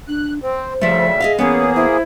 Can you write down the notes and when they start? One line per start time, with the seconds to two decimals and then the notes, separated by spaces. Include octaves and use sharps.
0.08 D4 F#6
0.42 C4 C5
0.81 D2 C#3 F3 G3 A3 E5
1.20 G#4 D#5 F5
1.39 E3 A#3 B3 C#4 G#4 C#5
1.76 E4 C5